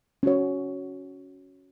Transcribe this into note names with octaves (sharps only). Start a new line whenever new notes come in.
C#4 F#4 C#5